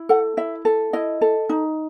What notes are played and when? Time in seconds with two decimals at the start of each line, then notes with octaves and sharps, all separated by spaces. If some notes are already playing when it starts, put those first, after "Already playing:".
Already playing: E4
0.09 A4 F#5
0.37 E4 E5
0.65 A4
0.93 E4 D#5
1.21 A4
1.49 D#4